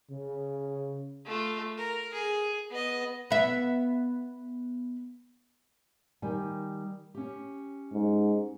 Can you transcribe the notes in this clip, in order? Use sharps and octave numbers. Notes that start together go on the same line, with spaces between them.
C#3
A3 F4
A#4
G#4
B3 D#5
B3 E5
D#3 G3 G#5
C#4 G4
G#2